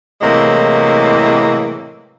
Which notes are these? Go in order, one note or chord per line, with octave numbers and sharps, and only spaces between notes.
A2 C3 E3 F#3 G#3 A#3